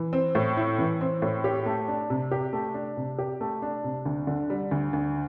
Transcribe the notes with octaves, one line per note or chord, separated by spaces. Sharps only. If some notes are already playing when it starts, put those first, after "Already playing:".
Already playing: E3
C4
A2
E4
E3
C4
A2
G4
A3
D4
C3
G4
A3
D4
C3
G4
A3
D4
C3
D2
D3
G3
D2
D2